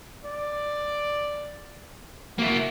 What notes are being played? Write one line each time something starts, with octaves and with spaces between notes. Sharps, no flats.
D5
A#3 E4 F#4